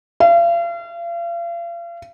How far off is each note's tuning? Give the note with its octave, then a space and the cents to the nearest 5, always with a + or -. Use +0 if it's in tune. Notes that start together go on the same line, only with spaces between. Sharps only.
F5 -40